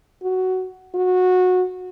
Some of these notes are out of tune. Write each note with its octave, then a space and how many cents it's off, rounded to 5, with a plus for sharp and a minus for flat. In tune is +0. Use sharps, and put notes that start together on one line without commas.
F#4 +10
F#4 -20